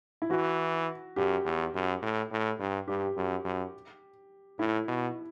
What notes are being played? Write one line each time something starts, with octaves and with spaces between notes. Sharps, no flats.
E4
E3 F#4
F#2 G4
E2
F#2
A2
A2
G2
G2 G4
F#2
F#2
A2 E4
B2